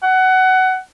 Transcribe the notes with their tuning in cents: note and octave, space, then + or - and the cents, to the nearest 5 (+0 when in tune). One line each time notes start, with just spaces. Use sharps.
F#5 +20